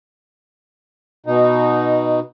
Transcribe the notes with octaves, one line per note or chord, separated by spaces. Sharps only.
B2 D#4